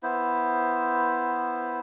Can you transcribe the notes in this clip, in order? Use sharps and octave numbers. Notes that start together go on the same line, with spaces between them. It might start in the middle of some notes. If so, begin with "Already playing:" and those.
B3 E4 C5